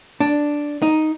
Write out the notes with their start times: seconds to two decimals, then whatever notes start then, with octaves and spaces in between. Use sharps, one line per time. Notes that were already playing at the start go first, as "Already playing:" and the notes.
0.20 D4
0.82 D#4